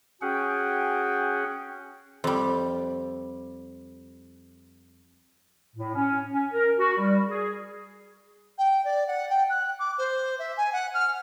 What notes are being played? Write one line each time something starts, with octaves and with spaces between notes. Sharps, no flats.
C#4 F#4 G#4 F#5 G5
F2 G3
A2
C#4
C#4
A#4
F#4
G3
G#4
G5
D5
F#5
G5
F#6
D6
C5
E5
G#5
F#5
F6